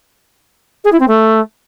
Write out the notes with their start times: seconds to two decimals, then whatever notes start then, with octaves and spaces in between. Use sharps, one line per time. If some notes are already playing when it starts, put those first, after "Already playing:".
0.84 G#4
0.92 E4
1.00 C4
1.08 A3